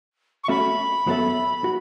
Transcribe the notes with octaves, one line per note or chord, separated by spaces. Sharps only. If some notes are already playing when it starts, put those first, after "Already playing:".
C#6
A3 C#4 F#4 A4 E5 B5
F#2 F#3 B3 A4 E5
F#4